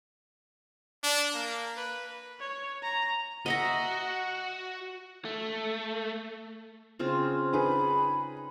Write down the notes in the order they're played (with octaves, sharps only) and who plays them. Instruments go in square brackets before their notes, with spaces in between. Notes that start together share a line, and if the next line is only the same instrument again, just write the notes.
[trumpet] D4
A#3
B4
[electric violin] C#5
A#5
[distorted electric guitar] F#4 [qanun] D#5 E5 A#5
[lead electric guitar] A3
[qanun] C#3 C4 F4
[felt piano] D#4 G#4 B4 [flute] B5